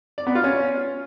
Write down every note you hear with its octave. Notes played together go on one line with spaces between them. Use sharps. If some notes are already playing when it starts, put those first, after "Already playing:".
D5
B3
F4
C#4